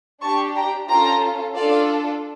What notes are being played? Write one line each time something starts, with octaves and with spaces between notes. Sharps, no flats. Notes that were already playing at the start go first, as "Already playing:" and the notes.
D4 G4 A5 C#6
G5 A#5
C#4 F4 A4 G5 A#5
D4 F4 A4 D5 F5